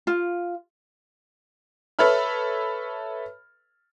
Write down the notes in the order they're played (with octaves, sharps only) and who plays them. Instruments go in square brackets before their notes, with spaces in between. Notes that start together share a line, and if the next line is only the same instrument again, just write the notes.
[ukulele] F4
[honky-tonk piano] A4 B4 C#5 E5 B5 F6